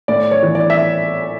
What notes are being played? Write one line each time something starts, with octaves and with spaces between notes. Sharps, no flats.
A2 D5
C#5
E3
D5
E5